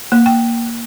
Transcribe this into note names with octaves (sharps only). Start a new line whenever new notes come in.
A#3
G5